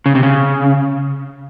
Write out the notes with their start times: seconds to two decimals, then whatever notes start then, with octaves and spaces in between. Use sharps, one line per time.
0.06 C#3
0.15 C3
0.23 C#3